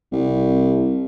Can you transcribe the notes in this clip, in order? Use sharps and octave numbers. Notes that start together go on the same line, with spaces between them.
C2